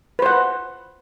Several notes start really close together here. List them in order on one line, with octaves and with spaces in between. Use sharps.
B4 C5 F#5